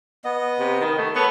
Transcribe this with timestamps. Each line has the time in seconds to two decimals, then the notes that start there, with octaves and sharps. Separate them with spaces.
0.24 B3 D#5
0.59 C3
0.81 D#3
0.98 A3
1.15 B3 A4 C#5 C#6